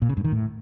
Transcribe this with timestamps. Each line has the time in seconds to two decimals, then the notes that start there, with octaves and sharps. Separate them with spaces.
0.02 A#2
0.09 C#3
0.17 G2
0.24 D#3
0.32 A2